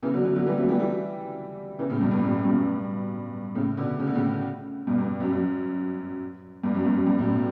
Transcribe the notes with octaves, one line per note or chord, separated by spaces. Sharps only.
C#3 E3
D3 F#3
D3 F#3
D3 F#3
E3 G3
F#3 A3
E3 G3
E3 G3
C#3 E3
A2 C#3
G2 B2
G2
F#2 A2
G2 B2
A2 C#3
B2 D3
C#3
D3
A2 C#3
G2 B2
G2
F#2
F#2
G2
F#2
G2
F#2
G2
F#2 A2
B2